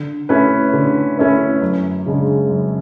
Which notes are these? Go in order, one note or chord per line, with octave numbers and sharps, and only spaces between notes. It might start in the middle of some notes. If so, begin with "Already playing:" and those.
Already playing: D3
A3 C#4 E4 B4
D3
A3 C#4 E4 B4
F#2
C#3 G#3 D4
F#2